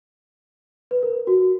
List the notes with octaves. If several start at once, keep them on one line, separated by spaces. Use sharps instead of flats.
B4
A#4
F#4